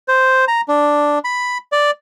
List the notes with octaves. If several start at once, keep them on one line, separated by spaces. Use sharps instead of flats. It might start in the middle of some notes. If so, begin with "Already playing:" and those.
C5
A#5
D4
B5
D5